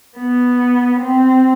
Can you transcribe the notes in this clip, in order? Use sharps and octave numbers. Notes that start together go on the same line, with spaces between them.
B3
C4